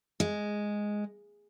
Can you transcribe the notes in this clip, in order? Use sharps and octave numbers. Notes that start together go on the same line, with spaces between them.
G#3